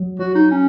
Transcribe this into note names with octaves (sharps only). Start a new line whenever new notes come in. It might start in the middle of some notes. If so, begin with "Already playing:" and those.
Already playing: F#3
F#3 F#4
D#4
C#4